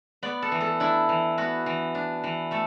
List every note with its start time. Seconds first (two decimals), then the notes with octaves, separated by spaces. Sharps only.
0.23 B3 D5
0.42 A4
0.52 E3
0.61 A4
0.80 D4 E4
1.09 E3
1.38 B3 F#4
1.66 E3
1.95 D4
2.24 E3
2.51 A3 A4